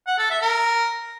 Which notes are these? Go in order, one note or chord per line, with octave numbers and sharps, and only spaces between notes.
F#5
A4
E5
A#4